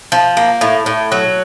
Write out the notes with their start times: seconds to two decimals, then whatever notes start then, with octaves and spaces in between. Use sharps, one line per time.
0.12 F3
0.37 A#3
0.61 A2
0.86 A2
1.12 F#3